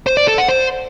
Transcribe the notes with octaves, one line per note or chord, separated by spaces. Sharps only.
C5
D5
A4
F#5
C5